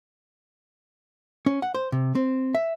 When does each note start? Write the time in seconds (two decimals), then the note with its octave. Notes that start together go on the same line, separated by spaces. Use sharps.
1.46 C#4
1.62 F#5
1.74 C5
1.92 C3
2.15 C4
2.55 E5